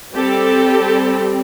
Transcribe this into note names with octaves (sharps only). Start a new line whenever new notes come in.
G3 C4 G4 A4